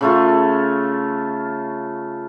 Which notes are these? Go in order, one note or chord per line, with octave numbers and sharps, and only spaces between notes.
C#3 A3 F4